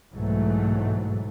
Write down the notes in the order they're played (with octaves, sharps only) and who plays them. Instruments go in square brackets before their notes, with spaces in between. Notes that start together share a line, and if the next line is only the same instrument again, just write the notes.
[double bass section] B1 G#2 E3 F#3 A3